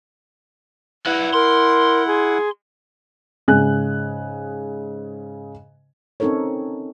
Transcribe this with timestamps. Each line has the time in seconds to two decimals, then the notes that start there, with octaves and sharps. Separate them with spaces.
1.06 E4 B4 D5 F#5
1.34 A#4 C6
2.07 G#4
3.48 G#2 C#3 G#5 F#6
6.20 C4 C#4 D#4 A4 A#4 C#5